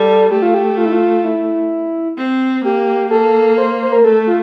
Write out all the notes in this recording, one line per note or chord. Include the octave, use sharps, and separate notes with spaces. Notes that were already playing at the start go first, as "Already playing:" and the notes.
Already playing: G3 A4
A3 G4
F4
G4
F4
E4
F4
E4
C4
A#3 G4
A#3 A4
C5
C5
A#4
A3 A4
F4